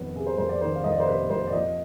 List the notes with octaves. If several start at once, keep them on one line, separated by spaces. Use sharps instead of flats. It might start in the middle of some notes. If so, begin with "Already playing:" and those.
Already playing: F2 D#3 B3
C3 G#4
C5
F2 C5
D5
D#3 C5
F5
F2 D#5
D5
C5
C3 B4
F2 C5
D5
F3 D#5